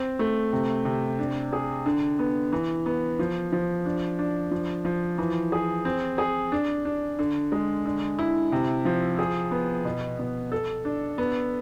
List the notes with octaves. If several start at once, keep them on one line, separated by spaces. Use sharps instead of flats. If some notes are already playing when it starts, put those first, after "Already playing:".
Already playing: C4
A3
C3
C3
D4
G#4
D3
B3
E3
B3
F3
F3
D4
D4
F3
F3
E3
G#4
C4
G#4
D4
D4
D3
G#3
D3
E4
C3
F3
G#4
B3
B2
B2
A4
D4
B3